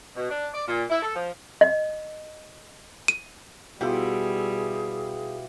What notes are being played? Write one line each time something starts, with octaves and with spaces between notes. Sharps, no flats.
B2
D4
D5
A#2
E4
A4
F3
D#5
D#7
B2 G3 E4 F4 G4 G#4